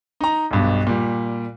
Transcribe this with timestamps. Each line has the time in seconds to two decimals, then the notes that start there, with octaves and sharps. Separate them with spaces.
0.21 D#4 A#5
0.51 B1 G2 B2
0.87 A#2 G3